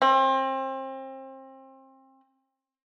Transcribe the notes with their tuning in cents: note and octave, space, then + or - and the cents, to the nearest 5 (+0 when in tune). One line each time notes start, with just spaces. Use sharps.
C4 +30